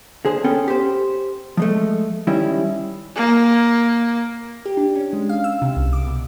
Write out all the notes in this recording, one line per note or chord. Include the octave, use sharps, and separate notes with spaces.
D3 G#4 C5
B3 C#4 A4 G5
G4 C5
F3 G#3 A3
D#3 G3 C#4 E4
A#3
G4
D4
C#4
G#3
F5
E6
C3
C2
D6
B2